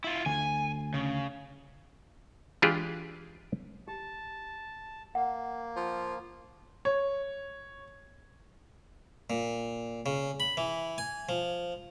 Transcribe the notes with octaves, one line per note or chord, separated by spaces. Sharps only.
E4 F4
D2 G#5
C#3
E3 G#3 D4 F4 G4 G#4
G4 A5
A#3 F#5
F3
C#5
A#2
C#3
B5
E3
G#5
F3